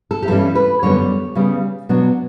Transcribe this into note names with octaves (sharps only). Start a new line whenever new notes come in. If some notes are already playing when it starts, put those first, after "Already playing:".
A4
G4
G2 E3 G3 C#4 A4
B4
F#2 D3 G3 B3 C#5
C#3 G3 B3
B2 F#3 B3 D4